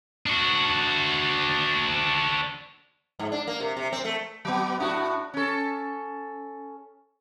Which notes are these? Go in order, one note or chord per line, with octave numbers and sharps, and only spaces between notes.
D4 F#4
G#2
D4
A#3
C3
C3
C4
A3
F#3 B3
A2 D4 F#4
C#4 A4